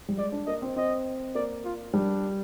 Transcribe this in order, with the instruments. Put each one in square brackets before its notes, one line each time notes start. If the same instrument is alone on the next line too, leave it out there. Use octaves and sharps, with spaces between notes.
[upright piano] G3
[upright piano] G#3 [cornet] D5
[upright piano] D4
[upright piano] A#3 [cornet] D#5
[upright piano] C4
[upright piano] C4 [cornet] D#5
[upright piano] A#3 [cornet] D5
[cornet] F4
[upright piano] G3 [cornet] D4